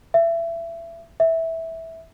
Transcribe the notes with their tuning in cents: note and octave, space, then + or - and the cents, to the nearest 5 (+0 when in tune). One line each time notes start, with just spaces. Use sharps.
E5 +25
E5 -10